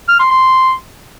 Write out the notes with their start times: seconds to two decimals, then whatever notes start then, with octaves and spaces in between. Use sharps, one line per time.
0.08 F6
0.19 C6
0.31 C6